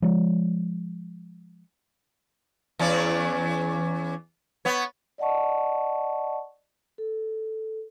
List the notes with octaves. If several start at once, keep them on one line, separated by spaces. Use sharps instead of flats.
F3 G#3
E2 C#4 D5
B3 C#5
D5 D#5 F#5 A5 C#6
A4